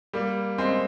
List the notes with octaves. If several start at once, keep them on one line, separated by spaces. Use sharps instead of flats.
G3 A#3
G#3 C4